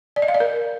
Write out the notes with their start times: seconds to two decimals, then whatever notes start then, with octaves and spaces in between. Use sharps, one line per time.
0.16 D5
0.22 D#5
0.28 F5
0.34 D5
0.40 A#4